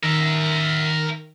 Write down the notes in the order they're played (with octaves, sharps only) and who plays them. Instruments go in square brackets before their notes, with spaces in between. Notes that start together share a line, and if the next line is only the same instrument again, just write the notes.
[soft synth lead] D#3 [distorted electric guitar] A#4 E5